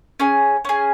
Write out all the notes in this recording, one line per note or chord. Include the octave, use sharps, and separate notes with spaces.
C#4 G#4
C#4 G#4